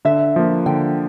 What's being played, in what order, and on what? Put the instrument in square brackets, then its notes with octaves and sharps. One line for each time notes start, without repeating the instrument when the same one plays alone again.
[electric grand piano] D3 [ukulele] E5
[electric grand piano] F3 A#3
[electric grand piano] D3 [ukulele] G5